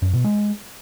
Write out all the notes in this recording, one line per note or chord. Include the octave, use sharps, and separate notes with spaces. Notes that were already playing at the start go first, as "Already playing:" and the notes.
F#2
B2
G#3